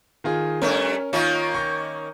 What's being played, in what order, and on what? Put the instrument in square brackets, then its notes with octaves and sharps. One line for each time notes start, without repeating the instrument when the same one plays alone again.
[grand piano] D#3 F4 G#4
[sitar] G2 A3 [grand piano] C#4 A#4 C#5
[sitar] D#3 A#3 C#4 [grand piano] F4
[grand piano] C#6 G6